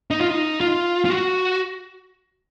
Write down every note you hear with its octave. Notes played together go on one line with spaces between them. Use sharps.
D#4
F4
D#4
F4
F4
F#4